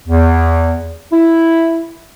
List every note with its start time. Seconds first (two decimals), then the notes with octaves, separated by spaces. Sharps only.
0.08 E2
1.12 E4